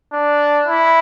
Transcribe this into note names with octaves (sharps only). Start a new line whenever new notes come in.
D4
E4